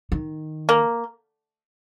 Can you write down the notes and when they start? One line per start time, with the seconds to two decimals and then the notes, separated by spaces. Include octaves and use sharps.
0.12 D#3
0.69 A#3